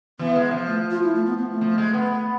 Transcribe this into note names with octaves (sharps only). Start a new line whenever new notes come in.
E3 B3
G#3
F3
A3
F4
E4
A3
B3
B3
A3
F3
G#3
B3